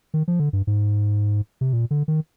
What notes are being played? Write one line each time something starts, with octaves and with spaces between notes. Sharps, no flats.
D#3
F3
D3
G2
G#2
C3
A#2
D3
D#3